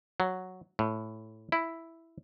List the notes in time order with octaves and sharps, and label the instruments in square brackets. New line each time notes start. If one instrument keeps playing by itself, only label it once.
[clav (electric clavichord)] F#3
A2
E4